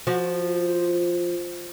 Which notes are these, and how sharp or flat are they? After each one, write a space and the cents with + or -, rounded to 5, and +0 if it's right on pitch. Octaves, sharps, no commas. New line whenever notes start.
F3 +0 F#4 -25